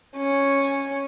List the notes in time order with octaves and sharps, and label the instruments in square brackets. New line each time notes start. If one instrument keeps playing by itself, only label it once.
[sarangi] C#4